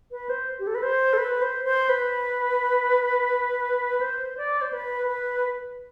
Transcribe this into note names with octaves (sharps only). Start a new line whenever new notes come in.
B4
C5
G4
A4
B4
C5
A4
B4
C5
C5
B4
C5
D5
C5
B4
B4